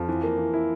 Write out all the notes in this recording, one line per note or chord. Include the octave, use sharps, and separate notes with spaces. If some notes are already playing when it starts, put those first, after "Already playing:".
Already playing: F2 F3
E3
A#3
E3
E4